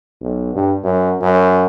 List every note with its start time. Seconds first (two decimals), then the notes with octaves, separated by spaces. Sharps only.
0.22 B1
0.54 G2
0.84 F#2
1.22 F#2